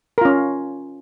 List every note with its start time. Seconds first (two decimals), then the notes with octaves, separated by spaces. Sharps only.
0.18 A#4
0.21 F4
0.25 C#4